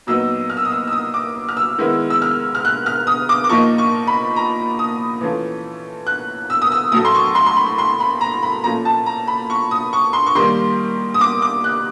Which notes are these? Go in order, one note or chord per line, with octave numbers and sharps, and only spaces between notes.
A#2 F#3 B3 D#4 E6
F6
E6
D#6
E6
E6
D#6
D6
F6
E6
D#3 G#3 B3 E4
E6
F6
F6
F#6
F6
D#6
D6
D6
A#2 F3 A#3 D#4 C#6
C#6
B5
A#5
D#6
E3 A3 C#4 F4
F#6
E6
D#6
E6
A2 F#3 A3 D#6
C6
C#6
C6
C6
B5
C6
B5
A#5
B5
A#2 F3 A3 C#4 F4 A#5
A5
A#5
B5
C#6
D#6
C#6
C6
C#6
D#3 G3 A#3 C6
D#6
D6
D6
F#6